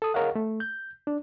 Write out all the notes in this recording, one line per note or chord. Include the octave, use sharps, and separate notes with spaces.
A4 D#6
G#4 A#4 C#5 D#5 F5 F#5
A3
G6
D4